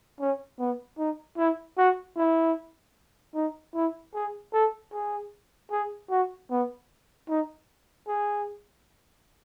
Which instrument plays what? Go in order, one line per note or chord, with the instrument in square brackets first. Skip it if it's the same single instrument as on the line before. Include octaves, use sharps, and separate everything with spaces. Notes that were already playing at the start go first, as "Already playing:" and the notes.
[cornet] C#4
B3
D#4
E4
F#4
E4
D#4
E4
G#4
A4
G#4
G#4
F#4
B3
D#4
G#4